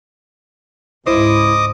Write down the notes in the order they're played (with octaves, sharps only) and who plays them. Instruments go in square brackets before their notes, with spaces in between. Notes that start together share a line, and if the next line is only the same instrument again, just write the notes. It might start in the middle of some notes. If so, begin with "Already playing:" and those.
[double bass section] C#2 G#2 [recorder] E4 [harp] C5 [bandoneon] D#5 D6 D#6